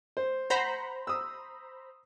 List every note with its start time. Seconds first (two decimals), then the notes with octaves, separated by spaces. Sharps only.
0.17 C5
0.50 C5 F#5 A#5 B5
1.07 D#6 E6